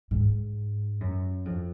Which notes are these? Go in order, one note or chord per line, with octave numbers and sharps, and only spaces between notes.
G#2
F#2
F2